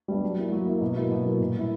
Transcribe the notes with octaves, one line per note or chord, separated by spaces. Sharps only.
G3 B3 D4
F#3
A#3 E4
F#3
A#3 E4
B2
F#3 A#3 E4
B2
F#3 A#3 E4
A#2
G3 A#3 E4